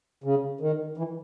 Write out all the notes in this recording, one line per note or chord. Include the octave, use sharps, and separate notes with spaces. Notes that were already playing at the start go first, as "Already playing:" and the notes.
C#3
D#3
E3